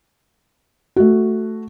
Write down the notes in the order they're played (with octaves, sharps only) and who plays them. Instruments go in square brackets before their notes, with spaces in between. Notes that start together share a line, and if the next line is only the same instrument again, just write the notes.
[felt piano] A3 F#4